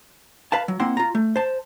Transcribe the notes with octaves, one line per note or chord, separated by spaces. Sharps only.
B4 F5 A5
F#3
A#3 C4 E4 F#5 C6
F4 A#5
A3
C5 A5